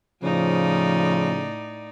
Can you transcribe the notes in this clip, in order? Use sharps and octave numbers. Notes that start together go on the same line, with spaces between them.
A2 C#3 F3 D#4 D5